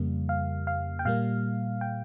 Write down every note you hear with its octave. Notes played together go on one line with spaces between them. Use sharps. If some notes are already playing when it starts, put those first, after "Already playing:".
Already playing: F2 C#3 G3 A#3
F5
F5
G5
A#2 G3 A#3 F5
G5